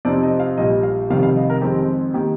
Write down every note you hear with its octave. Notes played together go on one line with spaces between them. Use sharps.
F2 C3 F3 C4 D#4 D5
D#5
F5
A#1 A#2 G3 D#5
F5
F1 F2 C3 D#3 G3 F5
F5
D#5
A#4
F2 D#3 G#3 C4 G4
D#3 A#3 G4